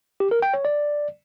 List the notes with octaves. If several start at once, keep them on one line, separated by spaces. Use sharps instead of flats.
G4
A#4
G5
C#5
D5